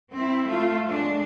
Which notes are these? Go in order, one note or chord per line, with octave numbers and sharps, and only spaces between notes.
C4 E4
A3 F4
G#3 D4